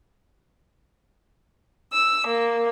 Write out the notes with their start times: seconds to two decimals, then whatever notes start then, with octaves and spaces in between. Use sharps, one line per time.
1.92 E6
2.27 A#3